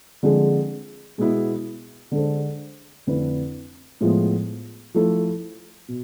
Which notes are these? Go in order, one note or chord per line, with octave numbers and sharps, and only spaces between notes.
D3 F3 G#3 C4 G#4
B2 G#3 B3 E4
D3 G#3 D4 A4 C5
F2 D3 A3 E4 B4
A2 F3 G#3 B3 F4
F3 A3 E4 A4
B2